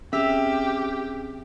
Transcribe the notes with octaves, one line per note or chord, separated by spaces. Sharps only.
C4 C#4 G4 G#4 E5 F6